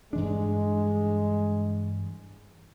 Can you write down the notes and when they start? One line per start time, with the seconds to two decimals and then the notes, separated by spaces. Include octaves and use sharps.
0.13 G2 E3 G#3 D4